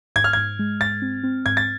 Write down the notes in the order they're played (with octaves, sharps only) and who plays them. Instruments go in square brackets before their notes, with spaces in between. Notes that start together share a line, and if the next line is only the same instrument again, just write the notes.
[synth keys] G#2 [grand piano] G#6
[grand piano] F6
[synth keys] G#2 [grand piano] G#6
[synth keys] G#3
[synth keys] G#2 [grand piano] A6
[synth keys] C4
C4
[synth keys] G#2 [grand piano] G#6
[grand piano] A6